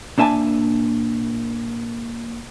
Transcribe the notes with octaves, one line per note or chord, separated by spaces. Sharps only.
A#2 D4 E5 G#5 A5